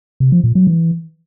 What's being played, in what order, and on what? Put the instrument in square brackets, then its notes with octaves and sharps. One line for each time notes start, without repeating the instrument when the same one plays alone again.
[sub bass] C3
F3
A#2
F#3
E3